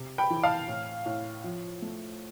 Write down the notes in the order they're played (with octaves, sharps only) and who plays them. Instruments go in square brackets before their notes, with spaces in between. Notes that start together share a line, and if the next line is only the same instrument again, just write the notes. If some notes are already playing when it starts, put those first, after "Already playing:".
Already playing: [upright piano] C3
G5 B5
E3
F5 A5
A2
A2
F3
A3